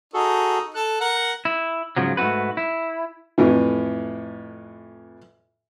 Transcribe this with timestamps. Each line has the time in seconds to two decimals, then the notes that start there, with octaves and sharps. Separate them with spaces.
0.14 D#4 F#4 G#4 A4
0.74 A4 F#6
1.01 A#4 F#5
1.45 E4
1.97 G#2 C#3 F3 F#3
2.17 G#2 A3 C4 F#4 B4
2.57 E4
3.38 F2 A2 E3